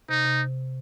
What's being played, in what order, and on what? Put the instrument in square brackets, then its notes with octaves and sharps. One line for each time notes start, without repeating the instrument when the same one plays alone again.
[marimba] C3 [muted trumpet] D#4
[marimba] C3